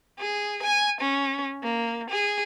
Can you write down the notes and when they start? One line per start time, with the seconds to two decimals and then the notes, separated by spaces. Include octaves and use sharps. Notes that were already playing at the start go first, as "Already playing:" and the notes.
0.19 G#4
0.63 G#5
1.01 C#4
1.63 A#3
2.10 G#4